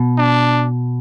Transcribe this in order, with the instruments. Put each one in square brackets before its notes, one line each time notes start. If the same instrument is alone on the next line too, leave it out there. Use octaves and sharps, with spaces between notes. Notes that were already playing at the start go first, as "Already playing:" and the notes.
Already playing: [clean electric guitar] B2
[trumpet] D4